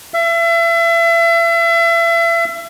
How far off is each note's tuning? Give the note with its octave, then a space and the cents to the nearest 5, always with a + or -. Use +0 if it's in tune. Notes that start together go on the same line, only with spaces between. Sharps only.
E5 +35